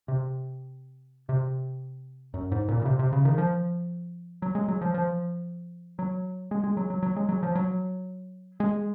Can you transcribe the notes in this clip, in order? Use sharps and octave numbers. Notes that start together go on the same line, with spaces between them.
C3
C3
F#2
G#2
A#2
C#3
C3
C3
C#3
D#3
F3
F#3
G#3
F#3
F3
F3
F#3
G#3
G#3
F#3
F#3
F#3
G#3
F#3
F3
F#3
G#3